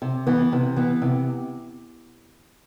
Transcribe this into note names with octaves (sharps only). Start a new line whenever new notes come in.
C3
E3 B3
C3
E3 B3
C3